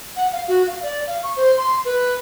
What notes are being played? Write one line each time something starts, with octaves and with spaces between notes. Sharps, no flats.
F#5
F5
F#4
F5
D5
F5
C#6
C5
C6
B4